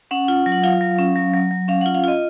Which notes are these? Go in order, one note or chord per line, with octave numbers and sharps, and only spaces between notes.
C#4 F#5
F4
F#3
F#5
F4 F5
F#3
C#4
F#3
F#3
F#3
C#4 F5
F#5
F4
F5
F4 D#5